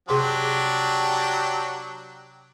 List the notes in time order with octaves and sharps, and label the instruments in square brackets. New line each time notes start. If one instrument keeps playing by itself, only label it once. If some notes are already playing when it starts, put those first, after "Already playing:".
[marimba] C3 G#4 C6 [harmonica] F#3 D4 G4